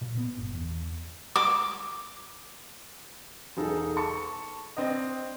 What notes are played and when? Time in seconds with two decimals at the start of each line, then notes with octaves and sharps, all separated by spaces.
0.01 A#2
0.17 B3
0.37 G1
0.53 E2
1.36 D6
3.57 E1 D#4 G#4 A4
3.97 A5 C#6 C#7
4.77 C4 D4 D#5